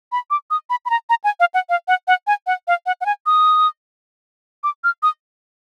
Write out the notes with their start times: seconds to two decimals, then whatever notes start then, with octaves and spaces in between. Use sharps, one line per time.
0.12 B5
0.31 D6
0.51 D#6
0.70 B5
0.85 B5
0.90 A#5
1.10 A#5
1.24 G#5
1.40 F5
1.54 F#5
1.69 F5
1.88 F#5
2.08 F#5
2.27 G#5
2.47 F#5
2.68 F5
2.86 F#5
3.01 F#5
3.06 G#5
3.26 D#6
4.64 D6
4.84 F6
5.03 D#6